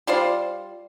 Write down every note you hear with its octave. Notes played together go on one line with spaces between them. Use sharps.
G3 F4 C5 D5